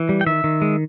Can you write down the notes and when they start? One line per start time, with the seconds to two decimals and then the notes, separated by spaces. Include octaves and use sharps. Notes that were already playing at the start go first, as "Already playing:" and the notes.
Already playing: E3
0.09 G3
0.21 G5
0.26 D#3 E5
0.44 D#3
0.62 G#3